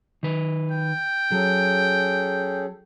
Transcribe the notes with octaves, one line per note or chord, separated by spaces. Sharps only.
D#3 B4
G5
F#3 C#4 G#4 A4